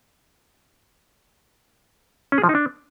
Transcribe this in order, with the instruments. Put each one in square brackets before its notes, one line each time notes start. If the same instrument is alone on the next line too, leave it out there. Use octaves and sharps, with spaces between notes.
[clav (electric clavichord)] C#4
G#4
F3
D#4
D4